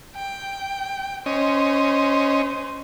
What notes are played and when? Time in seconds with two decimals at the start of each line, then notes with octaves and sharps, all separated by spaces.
0.16 G5
1.26 C#4 C5 D#5